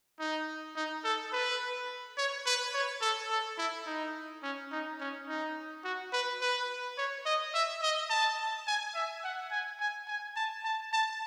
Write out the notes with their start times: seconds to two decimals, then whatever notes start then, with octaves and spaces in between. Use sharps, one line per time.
0.19 D#4
0.76 D#4
1.04 A4
1.33 B4
2.17 C#5
2.46 B4
2.74 C#5
3.02 A4
3.30 A4
3.58 E4
3.87 D#4
4.43 C#4
4.72 D#4
5.00 C#4
5.28 D#4
5.84 F#4
6.13 B4
6.41 B4
6.98 C#5
7.26 D#5
7.54 E5
7.82 D#5
8.10 A5
8.67 G#5
8.95 E5
9.23 F#5
9.51 G#5
9.80 G#5
10.08 G#5
10.36 A5
10.65 A5
10.93 A5